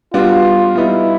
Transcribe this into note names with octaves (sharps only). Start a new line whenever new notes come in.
G3 B3 D4 F4 F#4
G3 B3 D#4 E4